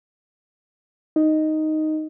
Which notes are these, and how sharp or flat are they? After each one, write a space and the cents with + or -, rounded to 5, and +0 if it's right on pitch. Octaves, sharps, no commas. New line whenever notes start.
D#4 +0 D#5 +0